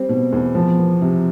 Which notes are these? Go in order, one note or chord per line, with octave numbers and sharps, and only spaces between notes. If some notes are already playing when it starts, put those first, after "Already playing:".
Already playing: G3 C4
B2
E2
F3
B3
C3